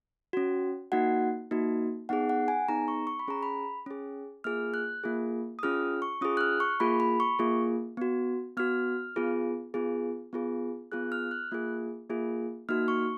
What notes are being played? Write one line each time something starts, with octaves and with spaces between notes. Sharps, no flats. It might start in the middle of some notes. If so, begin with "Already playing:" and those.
C#4 F#4
A#3 D#4 F#4 F#5
A#3 D#4 F#4
B3 D#4 G#4 F#5
F#5
G#5
B3 D#4 G#4 A#5
C#6
C#6
B5
C#4 G#4 A#5
B5
C#4 G#4
A#3 F4 G#4 F6
F#6
A#3 F4 G#4
D#6
C#4 F4 G#4 F6
C#6
C#4 F4 G#4 D#6
F#6
F6
C#6
A#3 F4 G#4 B5
B5
C#6
A#3 F4 G#4
B3 F#4
B3 F#4 F6
B3 F4 G#4
B3 F4 G#4
B3 F4 G#4
B3 F4 G#4 F#6
F6
F#6
A#3 F4 G#4
A#3 F4 G#4
A#3 D#4 F#4 F6
C#6